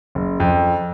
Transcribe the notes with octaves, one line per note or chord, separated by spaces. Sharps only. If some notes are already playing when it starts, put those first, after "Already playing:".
F#1
F2